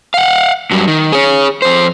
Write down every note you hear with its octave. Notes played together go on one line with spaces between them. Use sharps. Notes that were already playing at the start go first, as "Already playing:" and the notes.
F5 F#5
G2 F#3
D#3
G#4 C#5
F2 C5